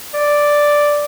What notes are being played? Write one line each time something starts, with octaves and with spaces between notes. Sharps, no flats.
D5